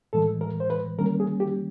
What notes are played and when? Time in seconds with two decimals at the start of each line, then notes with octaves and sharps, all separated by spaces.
0.13 A2 E3 G#3 A4
0.41 A#4
0.60 C5
0.70 B4
0.98 D#3 G3 A#3 C#4 A#4
1.20 G#4
1.40 G4